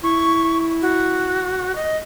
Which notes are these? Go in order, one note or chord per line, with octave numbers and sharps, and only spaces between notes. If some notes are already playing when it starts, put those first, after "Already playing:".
E4 C#6
F#4
D#5